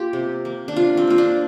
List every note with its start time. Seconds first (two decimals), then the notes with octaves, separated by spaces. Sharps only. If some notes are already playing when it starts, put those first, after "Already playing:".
Already playing: A#3 F4 G4
0.13 C3
0.45 A#3
0.68 D4
0.76 C3 F4
0.97 C4
1.07 A#3 F4
1.18 D4